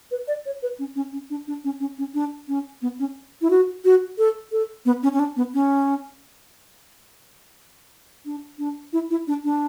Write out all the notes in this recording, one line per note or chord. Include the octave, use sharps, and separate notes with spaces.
B4
D5
C#5
B4
C#4
C#4
C#4
D4
D4
C#4
C#4
C#4
D4
C#4
B3
C#4
E4
F#4
F#4
A4
A4
B3
C#4
C#4
D4
B3
C#4
D4
D4
E4
E4
D4
D4